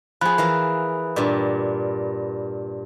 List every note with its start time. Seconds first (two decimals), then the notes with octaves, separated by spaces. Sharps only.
0.21 F3 G#4 B5 F#6
0.38 E3 A#4 F5
1.16 G2 A#2